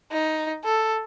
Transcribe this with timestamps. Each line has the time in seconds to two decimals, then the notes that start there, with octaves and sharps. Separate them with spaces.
0.12 D#4
0.64 A4